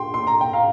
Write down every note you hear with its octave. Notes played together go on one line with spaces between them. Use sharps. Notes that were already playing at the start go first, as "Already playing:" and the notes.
Already playing: G5 C6
C6
A#5
G5
F5 A#5